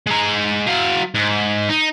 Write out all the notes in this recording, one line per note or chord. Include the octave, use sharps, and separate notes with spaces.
G#3 A#5
F#3 F5
G#2
D#4